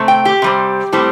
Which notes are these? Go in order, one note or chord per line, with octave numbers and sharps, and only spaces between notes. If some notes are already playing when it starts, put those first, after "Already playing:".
Already playing: C3 A3 C4
G5
G4
C3 G3 C4
A2 G3 C4